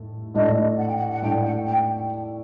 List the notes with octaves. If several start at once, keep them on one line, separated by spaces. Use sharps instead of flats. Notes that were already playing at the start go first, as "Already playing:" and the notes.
Already playing: A2 A3
A2 A3 D4 D#5
F#5
G5
F#5
F#5
A2 A3 D4 G5
F#5
G5